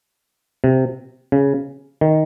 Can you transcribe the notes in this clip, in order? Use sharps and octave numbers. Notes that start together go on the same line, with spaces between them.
C3
C#3
D#3